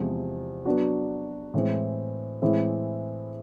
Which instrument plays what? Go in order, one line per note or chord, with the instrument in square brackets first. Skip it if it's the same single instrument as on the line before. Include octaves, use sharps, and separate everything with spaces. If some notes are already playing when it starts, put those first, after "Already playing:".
Already playing: [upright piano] E2 C3 F3 G#3 C4
F#3 B3 D4 F#4
A2 E3 G#3 C4
A2 E3 G#3 C4 E4